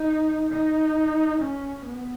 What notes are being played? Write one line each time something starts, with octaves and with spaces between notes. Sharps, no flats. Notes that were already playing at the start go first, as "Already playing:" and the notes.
Already playing: D#4
D#4
C#4
B3